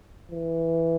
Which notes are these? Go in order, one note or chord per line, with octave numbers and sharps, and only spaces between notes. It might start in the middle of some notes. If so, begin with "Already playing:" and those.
E3